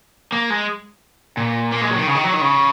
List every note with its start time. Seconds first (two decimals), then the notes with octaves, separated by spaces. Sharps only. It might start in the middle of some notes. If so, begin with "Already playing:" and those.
0.32 A#3
0.50 G#3
1.37 A#2
1.72 A#3
1.81 G#3
1.90 F#3
1.98 D#3
2.07 C#3
2.15 D#3
2.24 F#3
2.34 D#3
2.42 C#3